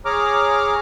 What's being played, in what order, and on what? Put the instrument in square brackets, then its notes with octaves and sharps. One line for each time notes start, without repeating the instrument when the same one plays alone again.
[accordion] G#4 C#5 A#5 D6 F6